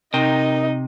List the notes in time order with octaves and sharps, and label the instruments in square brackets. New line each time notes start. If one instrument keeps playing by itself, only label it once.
[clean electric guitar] C3 [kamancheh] D#4 D#5 [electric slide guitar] A#4 G5